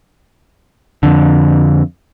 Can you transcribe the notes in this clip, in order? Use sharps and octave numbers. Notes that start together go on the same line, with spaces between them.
F2 D3